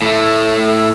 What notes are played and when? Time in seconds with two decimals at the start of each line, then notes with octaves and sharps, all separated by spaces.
0.02 A2 A3